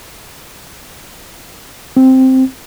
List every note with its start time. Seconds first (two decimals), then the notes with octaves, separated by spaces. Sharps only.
1.97 C4